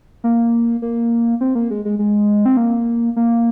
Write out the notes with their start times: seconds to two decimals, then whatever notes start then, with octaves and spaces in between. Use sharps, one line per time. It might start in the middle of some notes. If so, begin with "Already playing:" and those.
0.24 A#3
0.82 A#3
1.41 C4
1.55 A#3
1.70 G#3
1.85 G#3
1.99 G#3
2.45 C4
2.57 A#3
3.16 A#3